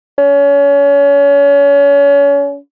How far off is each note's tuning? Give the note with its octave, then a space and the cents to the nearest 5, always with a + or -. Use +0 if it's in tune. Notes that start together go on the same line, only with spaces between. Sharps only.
C#4 +30